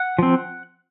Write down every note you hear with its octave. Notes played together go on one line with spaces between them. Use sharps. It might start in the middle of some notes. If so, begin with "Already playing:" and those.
Already playing: F#5
F3 C4